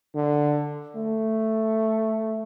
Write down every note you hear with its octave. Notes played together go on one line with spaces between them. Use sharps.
D3
A3